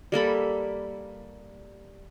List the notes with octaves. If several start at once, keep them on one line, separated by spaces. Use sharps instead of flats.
G3 A#3 A4 B5